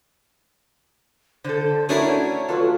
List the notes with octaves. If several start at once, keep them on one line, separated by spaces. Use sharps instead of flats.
D3 A4 C5
A3 C#4 D4 E4 F#4 A#4 C#5
F#3 A3 F4 A4 B4